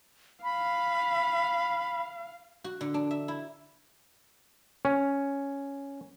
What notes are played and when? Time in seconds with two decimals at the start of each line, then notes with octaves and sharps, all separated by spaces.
0.44 F5 B5
2.64 F#4
2.81 D3
2.94 D4
3.11 E5
3.28 E4
4.85 C#4